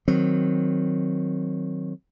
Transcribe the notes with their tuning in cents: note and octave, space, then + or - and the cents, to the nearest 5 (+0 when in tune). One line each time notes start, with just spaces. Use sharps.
D#3 +0 F#3 +0 C4 +0